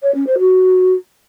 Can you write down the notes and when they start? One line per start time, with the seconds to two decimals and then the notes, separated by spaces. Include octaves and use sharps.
0.02 C#5
0.14 C#4
0.26 C5
0.38 F#4